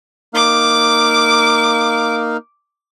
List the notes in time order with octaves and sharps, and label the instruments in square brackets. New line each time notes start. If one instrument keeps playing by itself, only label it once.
[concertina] A#3 D#4 F5 [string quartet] D6